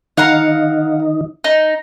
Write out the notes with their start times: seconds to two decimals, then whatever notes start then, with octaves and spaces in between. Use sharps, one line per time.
0.17 D#3 D#4 F5 F#5 A#5
1.44 D#4